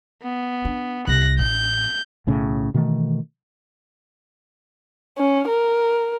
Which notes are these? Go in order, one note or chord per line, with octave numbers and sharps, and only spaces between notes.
B3
D4
C2 F#6 A#6
A1 G6
B1 A2 C#3
B2 D#3 E3 A3
C#4
A#4